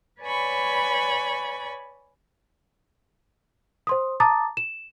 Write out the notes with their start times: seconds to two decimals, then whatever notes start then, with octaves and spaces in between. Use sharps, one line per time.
0.22 B4 C#5 D5 G#5 B5 C#6
3.87 C5 C6 D#6
4.20 A5 A#5 D6 D#6 A6
4.57 E7